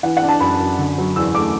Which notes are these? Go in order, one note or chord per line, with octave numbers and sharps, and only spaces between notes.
E3 F#5
F#5
D4
A5
F#2 B5
F#2
D3
F#3
E2 E6
A3 D6